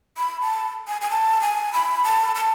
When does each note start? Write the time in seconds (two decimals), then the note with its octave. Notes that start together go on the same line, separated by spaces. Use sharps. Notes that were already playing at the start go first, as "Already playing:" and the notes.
0.18 B5
0.41 A5
0.87 G#5
1.01 G#5
1.10 A5
1.41 G#5
1.73 B5
2.04 A5
2.35 A5